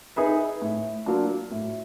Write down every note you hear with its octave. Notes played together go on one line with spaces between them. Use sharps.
D#4 G#4 B4 E5
A2
F#3 A#3 D4 F4
A2